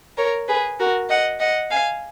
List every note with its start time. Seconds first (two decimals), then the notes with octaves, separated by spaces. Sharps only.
0.18 A#4 C#5
0.48 G#4 B4
0.80 F#4 A#4
1.10 D#5 F#5
1.40 D#5 F#5
1.71 F5 G#5